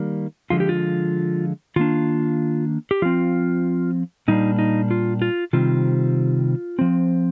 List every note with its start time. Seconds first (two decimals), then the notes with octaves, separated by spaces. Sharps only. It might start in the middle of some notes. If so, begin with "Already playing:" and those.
Already playing: D#3 G3 A#3
0.50 D3 F3 G#3 F4
0.60 G4
0.69 F4
1.76 D#3 A#3 D4 F4
2.91 G4
3.02 F3 C4 F4
4.28 A#2 G3 A#3 D4 D#4
4.59 D#4
4.91 F4
5.22 F4
5.53 C3 D#3 G3 C4 F4
6.79 F3 C4